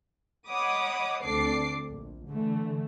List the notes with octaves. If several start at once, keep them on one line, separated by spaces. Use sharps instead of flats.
C#5 D#5 F#5 B5 D6 D#6
D2 C4 D4 A4 D6 C7
A#1
D3 E3 A3